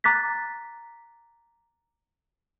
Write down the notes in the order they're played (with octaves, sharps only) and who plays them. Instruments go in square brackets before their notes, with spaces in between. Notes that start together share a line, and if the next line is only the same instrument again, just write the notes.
[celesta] A#5 D6 F#6 A6 B6